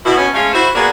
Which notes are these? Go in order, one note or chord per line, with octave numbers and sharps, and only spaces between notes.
B2 E4
B2 C#4
G#3 A3 C#4 C#5 F5
E4 F#4 C5
A#3 B3 D4 F#4 G#4 A#4